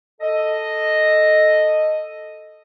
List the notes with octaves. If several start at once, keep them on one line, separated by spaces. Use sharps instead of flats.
A4 D#5